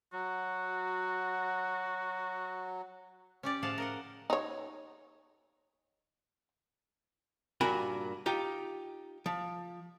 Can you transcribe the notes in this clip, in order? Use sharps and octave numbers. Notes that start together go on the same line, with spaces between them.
F#3 F#4
C#4 G4 D5
A2 F3 G#4 F5 F#5 A5
A#4 D#5 F#5
D#4 C#5
G2 A#2 F#4 A#4 G#5 B5
D#4 F4 G4
F3